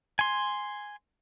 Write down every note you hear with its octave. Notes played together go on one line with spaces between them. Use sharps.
G#5 C6